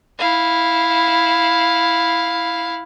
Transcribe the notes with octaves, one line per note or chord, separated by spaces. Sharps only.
E4 F5